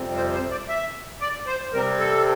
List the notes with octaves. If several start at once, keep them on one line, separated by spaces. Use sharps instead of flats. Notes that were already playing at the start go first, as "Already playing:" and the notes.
Already playing: F2 C3 G3 C4
C5
C5
D5
E5
D5
C5
C3 G3 C4 A#4
A4